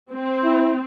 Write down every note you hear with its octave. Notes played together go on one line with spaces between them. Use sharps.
C4
E4